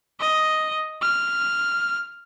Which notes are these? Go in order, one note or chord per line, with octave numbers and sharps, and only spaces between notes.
D#5
F6